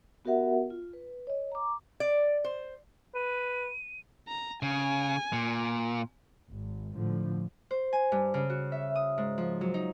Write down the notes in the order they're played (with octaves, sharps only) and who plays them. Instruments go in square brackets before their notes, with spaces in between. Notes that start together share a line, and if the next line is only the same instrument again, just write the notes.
[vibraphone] B3 F#4 G4 A#4 E5 F#5
F4
B4
C#5 D#5
A#5 D6
[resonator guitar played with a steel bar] D5
C5
[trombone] B4 [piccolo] D#7
[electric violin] A#5
[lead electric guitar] C#3 [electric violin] G#5
[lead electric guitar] A#2
[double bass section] G#1
A2 D3 F3
[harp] C5
G#5
G2
C#3
F#4
E5
D#6
G#2
F3
F#3
D#4